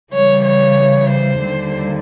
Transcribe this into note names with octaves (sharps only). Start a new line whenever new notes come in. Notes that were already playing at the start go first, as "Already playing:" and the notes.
C#3 E3 G3 C#5
C#5
C5
D#2 D3 G3